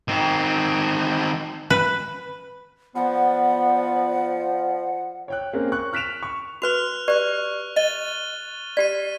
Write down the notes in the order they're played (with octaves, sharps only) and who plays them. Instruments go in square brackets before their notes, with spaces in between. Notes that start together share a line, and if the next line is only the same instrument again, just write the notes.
[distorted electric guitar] D#3 C4
[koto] B4
[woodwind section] F3 [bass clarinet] B3 [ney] D5 [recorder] F#5
[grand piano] C#5 G5 F#6
A#3 C4 C#4 G#4 A#4
C#6 F#6
F6 F#6 B6 D7 E7 F7
C#6
[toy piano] F#4 B4 [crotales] F6 F#6 F7
[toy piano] G4 B4 D5 [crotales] C#6 F#6
[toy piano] D#5 [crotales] A6 D#7 G7
[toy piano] G4 D5 [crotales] B6 D#7